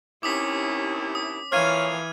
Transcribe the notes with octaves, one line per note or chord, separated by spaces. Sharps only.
D#2 C3 C#4 E4 D6 D#6 B6
D#6
F2 A#2 E3 C#5 F5 F6 G#6 D#7